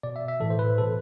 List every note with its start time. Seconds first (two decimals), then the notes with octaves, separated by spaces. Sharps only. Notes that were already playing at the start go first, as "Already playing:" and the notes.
0.03 B2 D5
0.16 E5
0.28 E5
0.40 A2 E3 A4
0.50 C5
0.59 B4
0.78 B2 A4